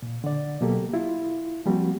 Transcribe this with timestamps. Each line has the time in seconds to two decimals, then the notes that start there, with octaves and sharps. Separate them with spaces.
0.02 A#2
0.24 D3 D5
0.61 B2 F#3 A#3 G4 A4
0.94 E4 F4
1.66 F3 G3 A#3 C4 F#4